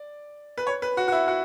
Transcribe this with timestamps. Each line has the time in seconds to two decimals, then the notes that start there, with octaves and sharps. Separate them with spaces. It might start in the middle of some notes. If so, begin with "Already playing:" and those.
Already playing: D5
0.58 B4
0.67 C#5
0.82 B4
0.97 F#4
1.08 F#4
1.12 E4
1.28 F#4